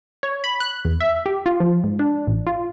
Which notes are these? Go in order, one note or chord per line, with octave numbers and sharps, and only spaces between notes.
C#5
B5
F#6
E2
E5
G4
F4
F3
G#2
D4
A1
F4